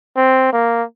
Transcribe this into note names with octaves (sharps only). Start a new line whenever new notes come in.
C4
A#3